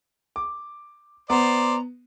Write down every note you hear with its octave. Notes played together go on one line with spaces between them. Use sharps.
D6
B3 C5 D5 A#5